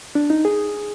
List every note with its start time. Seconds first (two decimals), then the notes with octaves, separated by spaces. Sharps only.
0.15 D4
0.30 D#4
0.45 G#4